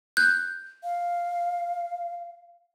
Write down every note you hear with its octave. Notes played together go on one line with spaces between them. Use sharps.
F#6 G6
F5